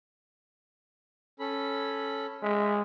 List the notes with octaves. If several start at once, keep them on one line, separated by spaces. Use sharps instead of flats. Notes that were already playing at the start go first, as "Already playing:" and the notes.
C#4 A4 B5
G#3 E5